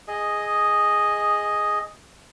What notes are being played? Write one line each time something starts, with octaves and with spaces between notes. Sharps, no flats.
G#4 D#5